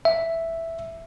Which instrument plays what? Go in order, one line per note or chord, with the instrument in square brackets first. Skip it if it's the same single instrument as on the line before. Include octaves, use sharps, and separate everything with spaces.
[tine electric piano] E5